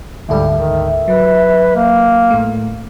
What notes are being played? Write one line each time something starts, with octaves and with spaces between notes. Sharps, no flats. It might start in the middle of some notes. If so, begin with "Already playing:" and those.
D2 G#2 G3 A4 E5
D#3
F#3 B4
A#3
A2 A3